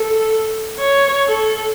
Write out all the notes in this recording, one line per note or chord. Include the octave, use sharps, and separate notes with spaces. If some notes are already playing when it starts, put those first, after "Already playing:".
Already playing: A4
C#5
A4